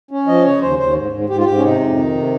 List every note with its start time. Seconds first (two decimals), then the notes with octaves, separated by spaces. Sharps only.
0.11 C#4
0.27 F3 D#5
0.44 C#3 C#5
0.62 D#2 C5
0.78 D#2 C5
0.95 G#2
1.12 G#2
1.29 G#2 G4
1.37 F4
1.44 G#2 G4
1.58 C#4
1.63 C3 D#4
1.80 F2
1.97 D#3
2.15 C3